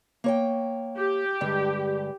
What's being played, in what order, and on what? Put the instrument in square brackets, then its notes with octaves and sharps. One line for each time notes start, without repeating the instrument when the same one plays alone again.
[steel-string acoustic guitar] A#3 C#5 G5
[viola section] G4
[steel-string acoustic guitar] G2 D3 G#3